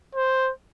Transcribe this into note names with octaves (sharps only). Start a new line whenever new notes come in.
C5